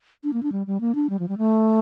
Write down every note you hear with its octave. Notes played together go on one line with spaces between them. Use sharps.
D4
A#3
D4
G3
G3
A#3
D4
G3
F3
G3
A3